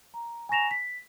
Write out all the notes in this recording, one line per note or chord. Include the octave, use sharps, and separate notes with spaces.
A#5
G#5 A#5 C#6 A#6 E7 F7
B6